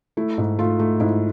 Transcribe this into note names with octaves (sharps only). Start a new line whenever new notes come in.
A3 E4
G#2
A3 F4
A3
G#2 E4